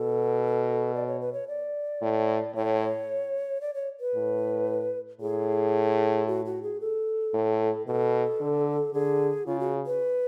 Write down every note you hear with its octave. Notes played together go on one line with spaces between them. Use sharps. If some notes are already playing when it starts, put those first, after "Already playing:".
Already playing: B2 A4
D5
C#5
B4
C#5
D5
A2
A2 C#5
D5
C#5
B4
A2
A2 G#4
F#4
F#4
G#4
A4
A2
B2 A4
D3
D3 G#4
C#3 F4
F#4
B4